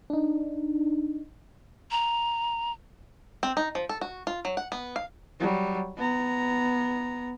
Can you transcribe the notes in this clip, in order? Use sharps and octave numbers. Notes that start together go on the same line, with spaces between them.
D4 D#4
A#5
C4
D#4
F3
A4
F#4
F4
F#3
F#5
B3
F5
F#3 G3
B3 A#5